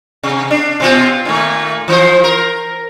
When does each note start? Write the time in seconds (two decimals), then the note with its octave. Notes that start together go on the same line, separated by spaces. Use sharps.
0.23 C3
0.51 D4
0.80 B2 C4 F4
1.25 A#2 D#3 A3
1.88 E3 F3 C5
2.24 A#4